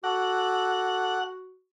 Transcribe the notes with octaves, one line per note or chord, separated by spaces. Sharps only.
F#4 A4 F#5 D6